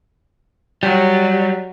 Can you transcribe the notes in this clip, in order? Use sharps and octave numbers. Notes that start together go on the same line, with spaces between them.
F#3 G3